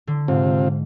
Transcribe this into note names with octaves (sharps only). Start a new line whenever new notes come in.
D3
G#2 C3 C4 F4